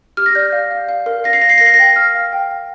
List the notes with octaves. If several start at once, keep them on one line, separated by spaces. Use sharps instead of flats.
G4 F6
A#6
D5 G6
F5
F5
F5
A#4
F5 A#6
C7
F5 A#6
C7
A#4 A#6
C7
A#6
G5
F5 F6
F5
G5
G5